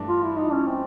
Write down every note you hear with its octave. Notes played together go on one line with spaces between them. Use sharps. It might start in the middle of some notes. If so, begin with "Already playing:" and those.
Already playing: G2 E3 A3 D4
F4
E4
D#4
C#4
C4